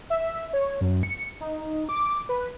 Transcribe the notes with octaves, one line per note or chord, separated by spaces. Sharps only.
E5
C#5
F#2
C#7
D#4
D6
B4